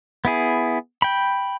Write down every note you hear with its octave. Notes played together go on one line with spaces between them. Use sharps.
B3 E4 G#4
G5 B5